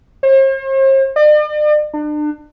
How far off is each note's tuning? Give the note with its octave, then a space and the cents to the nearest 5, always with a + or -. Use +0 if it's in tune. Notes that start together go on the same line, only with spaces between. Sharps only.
C5 +45
D5 +45
D4 +35